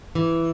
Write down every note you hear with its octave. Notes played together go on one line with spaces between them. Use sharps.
E3